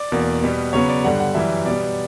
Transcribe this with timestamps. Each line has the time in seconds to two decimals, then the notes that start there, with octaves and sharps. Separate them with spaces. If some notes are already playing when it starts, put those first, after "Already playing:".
Already playing: D5
0.12 E2 B2 A#3
0.43 B2 G3 B3
0.73 C#3 F#3 B3 C#5
0.89 D5
1.04 G2 D3 G3 F#5
1.20 F#5
1.34 F#2 E3 G3 E5
1.65 B2 G3 B3 D5